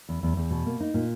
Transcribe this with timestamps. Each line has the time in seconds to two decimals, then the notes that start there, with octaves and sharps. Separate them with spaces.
0.09 E2
0.23 E2
0.37 E2
0.51 B2
0.66 A#3
0.80 D#4
0.94 A#2